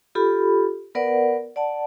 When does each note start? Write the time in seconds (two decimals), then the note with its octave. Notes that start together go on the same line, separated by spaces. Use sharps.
0.15 F4 G4 A4 B5
0.95 B3 A#4 B4 D5 F#5
1.56 D5 F#5 A5